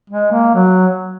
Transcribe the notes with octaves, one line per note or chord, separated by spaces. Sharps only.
G#3
A#3
F#3